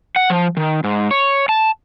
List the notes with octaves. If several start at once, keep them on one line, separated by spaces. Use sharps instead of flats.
F#5
F3
D#3
G#2
C#5
A5